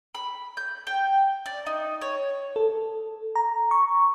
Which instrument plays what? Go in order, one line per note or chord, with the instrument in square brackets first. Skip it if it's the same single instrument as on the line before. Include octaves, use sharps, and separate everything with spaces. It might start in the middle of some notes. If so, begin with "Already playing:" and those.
[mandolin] B5
G6
G5
D5
D#4
C#5
[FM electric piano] A4
A#5
C#6